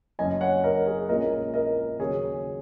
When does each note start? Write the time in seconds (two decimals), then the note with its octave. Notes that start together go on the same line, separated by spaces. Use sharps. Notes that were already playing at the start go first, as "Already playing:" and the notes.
0.19 F#1 F#2 F#3 C#4 D#5 G#5
0.41 C#5 F#5
0.64 A#4 D#5
0.86 G#4 C#5
1.09 A#1 A#2 G#3 C#4 A#4 D#5
1.54 A#4 D#5
1.99 D#2 C#3 F#3 C#4 G#4 C#5